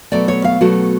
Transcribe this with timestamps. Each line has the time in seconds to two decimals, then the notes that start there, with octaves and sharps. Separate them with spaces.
0.12 B2 F#3 A3 D5
0.28 C#5
0.44 F5
0.61 B2 F#3 A3 F#4